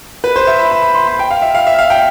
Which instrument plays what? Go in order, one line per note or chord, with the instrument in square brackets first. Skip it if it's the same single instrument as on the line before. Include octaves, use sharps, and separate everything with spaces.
[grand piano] B4
C5
E5
B5
B5
B5
C6
B5
G5
F5
E5
F5
E5
F5
G5